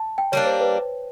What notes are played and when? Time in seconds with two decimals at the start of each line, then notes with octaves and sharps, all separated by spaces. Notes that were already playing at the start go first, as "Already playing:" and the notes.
Already playing: A5
0.18 G5
0.32 G3 A#3 D4 C#5
0.46 C5
0.60 B4